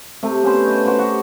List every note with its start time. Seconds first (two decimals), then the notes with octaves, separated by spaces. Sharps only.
0.23 C3 A3
0.43 B3 C#4 C5
0.66 B4 D#5
0.84 F#4 C5 G5 B5
0.99 F#4 G4